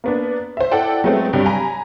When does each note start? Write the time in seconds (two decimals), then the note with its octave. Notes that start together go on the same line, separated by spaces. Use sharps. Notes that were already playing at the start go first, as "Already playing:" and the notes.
0.04 A#3 B3 D4
0.57 C5 E5
0.71 E4 A4 D5 F#5 G5 A5
1.04 F#3 G#3 A3 B3 C4
1.33 G2 C3 F#3 G3
1.46 G#5 A#5 B5